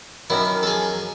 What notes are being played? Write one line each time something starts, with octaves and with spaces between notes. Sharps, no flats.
F#2 D#3 E4
A4
G#4